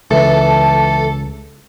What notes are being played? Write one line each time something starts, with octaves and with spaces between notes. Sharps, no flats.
C#2 E3 A4